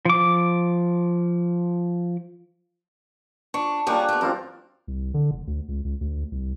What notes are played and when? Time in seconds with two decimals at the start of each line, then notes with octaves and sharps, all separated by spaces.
0.05 F3 D6
3.54 D4 C#6
3.87 G3 A#3 C#4 D4 G4 G#4
4.09 A3 B3
4.21 F#2 C4 F4 A#4
4.88 C2
5.14 D3
5.31 F1
5.47 D2
5.68 C#2
5.84 C#2
6.01 D2
6.32 C2